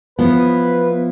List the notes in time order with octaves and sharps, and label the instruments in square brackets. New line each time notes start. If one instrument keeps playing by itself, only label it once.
[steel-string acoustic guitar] F3 E4 [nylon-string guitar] B3 [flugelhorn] B4